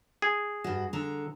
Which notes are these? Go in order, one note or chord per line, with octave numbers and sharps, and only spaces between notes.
G#4
G2 F#4
D3 A#5